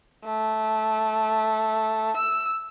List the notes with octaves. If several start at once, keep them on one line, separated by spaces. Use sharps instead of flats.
A3
E6